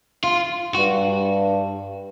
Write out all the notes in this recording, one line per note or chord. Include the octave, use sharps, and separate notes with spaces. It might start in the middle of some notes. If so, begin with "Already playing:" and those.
F4
G2 F#4